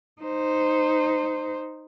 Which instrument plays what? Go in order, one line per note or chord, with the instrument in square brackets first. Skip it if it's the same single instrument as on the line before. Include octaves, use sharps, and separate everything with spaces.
[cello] D#4 C5